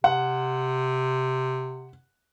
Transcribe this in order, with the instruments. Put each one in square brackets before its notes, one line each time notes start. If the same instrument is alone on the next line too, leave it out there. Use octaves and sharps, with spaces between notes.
[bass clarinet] C3 [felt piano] F#5